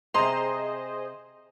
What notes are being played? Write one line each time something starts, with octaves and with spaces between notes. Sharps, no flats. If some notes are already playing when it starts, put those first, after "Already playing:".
C3 G#4 C5 D#5 A#5 C6